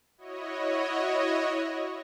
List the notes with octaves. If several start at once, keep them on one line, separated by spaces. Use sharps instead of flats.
E4 F#4 C#5 D#5